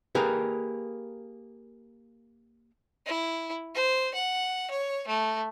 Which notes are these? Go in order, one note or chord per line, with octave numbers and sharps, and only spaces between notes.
A#3 G4 G#4 A#4 B4
E4
C5
F#5
C#5
A3